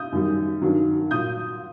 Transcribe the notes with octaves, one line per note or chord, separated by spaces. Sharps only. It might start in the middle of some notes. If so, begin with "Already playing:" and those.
Already playing: D#6 G6
F#2 D#3 G3
G2 D#3 F#3
A#2 F#3 D#6 G6